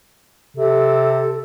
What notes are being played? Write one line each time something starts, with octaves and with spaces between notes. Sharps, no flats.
C3 A4